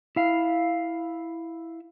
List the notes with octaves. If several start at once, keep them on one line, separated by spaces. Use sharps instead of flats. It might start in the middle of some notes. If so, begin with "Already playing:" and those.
E4 F5